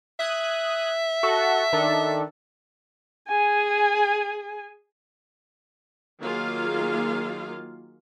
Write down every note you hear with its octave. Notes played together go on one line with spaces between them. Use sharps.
E5 D#6 F#6 G#6
F#4 A4
D#3 D4 A4
G#4 G#5
D#3 F#3 A#3 F4 G#4 F5